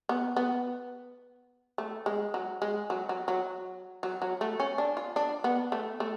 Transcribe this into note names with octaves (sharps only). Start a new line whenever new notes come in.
B3
B3
A3
G#3
F#3
G#3
F#3
F#3
F#3
F#3
F#3
A3
C#4
D4
F4
D4
B3
A3
A3